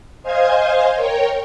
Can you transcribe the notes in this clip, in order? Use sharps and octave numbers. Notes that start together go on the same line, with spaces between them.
C5 D#5 F5 G#5 G#6
A#4 C#5 G5